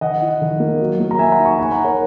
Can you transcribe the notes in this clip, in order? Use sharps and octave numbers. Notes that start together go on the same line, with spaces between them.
D#3 D#5 F#5
E4
D#3
A#3
F#3
A#3
A#5
F#3 E5 G#5
F#5 A#5
D#4
A#5 C#6
D#4 G#5 B5
F#5 A#5
D#4
A#4 C#5